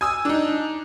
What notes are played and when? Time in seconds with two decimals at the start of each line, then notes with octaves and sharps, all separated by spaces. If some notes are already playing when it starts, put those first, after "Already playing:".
0.01 G#5 D#6 E6
0.25 D4 D#4